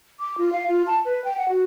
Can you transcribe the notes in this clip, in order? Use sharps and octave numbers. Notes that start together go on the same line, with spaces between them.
D6
F4
F5
F4
A5
B4
G5
F#5
F#4